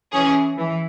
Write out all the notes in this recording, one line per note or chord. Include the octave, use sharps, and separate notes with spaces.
E3 C#4 G#4
E3